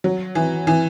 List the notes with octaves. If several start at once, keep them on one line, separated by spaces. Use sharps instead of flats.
F#3
E3
E3